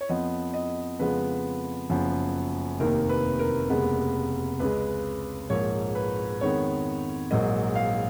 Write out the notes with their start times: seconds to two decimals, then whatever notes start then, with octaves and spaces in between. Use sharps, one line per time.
0.01 C#5
0.09 F2 F3 B3 D#5
0.54 D#5
0.99 F2 C#3 F3 G#3 B3 B4
1.90 F#1 F#2 F3 B3
2.80 F1 D#2 D#3 A#4
3.09 B4
3.39 A#4
3.69 F1 D#2 C#3 G#3 B3
4.60 C#2 C#3 G#3 B4
5.50 A#1 G#2 F3 A#3 C#5
5.95 B4
6.41 F2 D#3 G#3 B3 C#5
7.31 A#1 G#2 F#3 A#3 D#5
7.75 F5